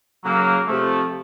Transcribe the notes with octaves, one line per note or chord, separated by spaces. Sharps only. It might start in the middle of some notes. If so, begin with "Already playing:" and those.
C#3 F#3 A#3
C3 F3 A3